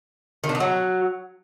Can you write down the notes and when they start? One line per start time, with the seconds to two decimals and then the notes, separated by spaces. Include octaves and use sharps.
0.44 D#3
0.49 D4
0.55 D#4
0.60 F#3